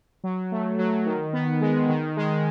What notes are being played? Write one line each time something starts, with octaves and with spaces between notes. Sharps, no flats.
F#3
A3
F#3
D#3
B3
G#3
D#3
G#3